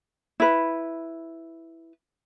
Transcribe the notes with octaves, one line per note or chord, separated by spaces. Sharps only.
E4 B4